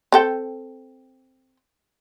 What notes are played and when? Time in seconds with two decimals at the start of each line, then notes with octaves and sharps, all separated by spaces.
0.12 C4 A4 G5